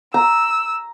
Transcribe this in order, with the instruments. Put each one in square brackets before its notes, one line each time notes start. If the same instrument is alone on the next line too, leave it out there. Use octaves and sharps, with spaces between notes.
[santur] A#5 [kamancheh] E6